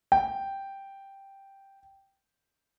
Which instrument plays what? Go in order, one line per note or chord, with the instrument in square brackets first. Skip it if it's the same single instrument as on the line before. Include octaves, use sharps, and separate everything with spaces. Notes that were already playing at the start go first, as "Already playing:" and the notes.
[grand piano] G5